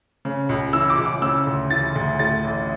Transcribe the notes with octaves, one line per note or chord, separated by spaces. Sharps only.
C#3
C#2
E3 E6
D6
C#2
D6
C#3 E6
D2
E3 A6
D2
A2 A6
A1